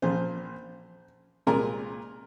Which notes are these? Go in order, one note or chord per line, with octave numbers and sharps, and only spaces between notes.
A#1 A#2 F3 C5
C2 A#2 G#3 A#4